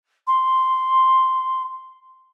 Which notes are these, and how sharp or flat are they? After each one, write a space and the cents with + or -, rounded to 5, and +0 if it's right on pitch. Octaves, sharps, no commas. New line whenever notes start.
C6 -5